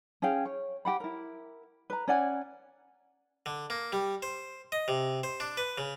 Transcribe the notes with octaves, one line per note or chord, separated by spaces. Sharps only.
C#4 G#4 F5 G5
C#5
G4 F#5 B5
E4 A#4
B4 A#5
C#4 D5 F#5 G#5
D3
A#3
G3
C5
D#5
C3
C5
D4
B4
C#3